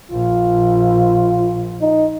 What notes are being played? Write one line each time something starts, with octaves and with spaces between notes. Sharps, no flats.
A#1 F4
D#4